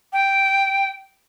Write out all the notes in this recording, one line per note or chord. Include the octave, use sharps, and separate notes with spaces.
G5